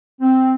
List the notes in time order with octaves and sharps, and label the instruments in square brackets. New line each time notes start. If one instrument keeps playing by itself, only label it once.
[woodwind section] C4